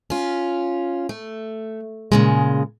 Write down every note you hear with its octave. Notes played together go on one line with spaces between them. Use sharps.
C#4 F4
A3
A#2 C#3 G#3